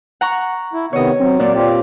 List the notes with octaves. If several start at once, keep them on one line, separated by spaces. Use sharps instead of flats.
F#5 A#5 C#6
E4
C3 D#3 B3 C#5 D#5
F#3 C4
A#2 D5
C4 F4 G4